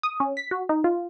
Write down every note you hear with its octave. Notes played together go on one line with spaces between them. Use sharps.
D#6
C#4
B6
F#4
D#4
F4